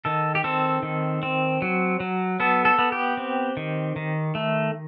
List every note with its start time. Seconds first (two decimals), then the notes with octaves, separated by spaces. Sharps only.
0.05 D#3 A4
0.35 G4
0.44 C4 A4
0.83 D#3
1.23 C4
1.62 F#3
2.00 F#3
2.40 B3 A4
2.65 A4
2.79 B3
2.92 G4
3.17 C4
3.57 D#3
3.96 D#3
4.35 A3